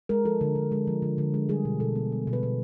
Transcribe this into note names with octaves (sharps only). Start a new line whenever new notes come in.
G#3 A#4
F3 A4
D3
D3
G#3
F3
D3
D3
G#3
G3 G#4
B2
B2 A4
B3
G3
B2
B4
B2